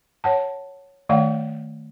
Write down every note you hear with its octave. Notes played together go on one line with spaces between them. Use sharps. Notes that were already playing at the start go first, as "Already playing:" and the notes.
C#5 F#5 A5
D#3 A3 D5 F5 F#5